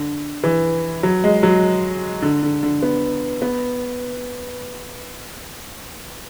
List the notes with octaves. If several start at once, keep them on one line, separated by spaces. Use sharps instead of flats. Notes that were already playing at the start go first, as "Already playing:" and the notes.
Already playing: D3
E3
F#3
G#3
F#3
D3
D3
D3
B3
B3